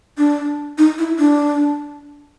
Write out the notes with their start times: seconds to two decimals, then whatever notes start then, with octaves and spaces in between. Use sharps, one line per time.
0.18 D4
0.78 D#4
0.99 E4
1.19 D4